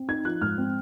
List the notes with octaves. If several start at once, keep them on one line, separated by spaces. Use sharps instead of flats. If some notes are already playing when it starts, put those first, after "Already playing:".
Already playing: C4
D#4 G#6
F3 F#6
G#2 F6
C4